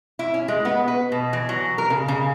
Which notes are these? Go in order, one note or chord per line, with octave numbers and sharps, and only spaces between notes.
E4
C#4
G#3
B3
B4
B2
E3
F#3
A#4
C#3
C#3